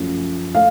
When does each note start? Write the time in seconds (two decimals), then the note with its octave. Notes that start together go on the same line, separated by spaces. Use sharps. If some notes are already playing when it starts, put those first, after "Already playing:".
Already playing: F#2 F3 A3
0.55 A3 F5